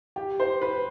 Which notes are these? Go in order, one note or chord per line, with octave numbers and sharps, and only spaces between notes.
G4
C5
B4